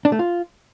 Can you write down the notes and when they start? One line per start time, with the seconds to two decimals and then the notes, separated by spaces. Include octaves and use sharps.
0.05 D4
0.12 A3
0.19 F4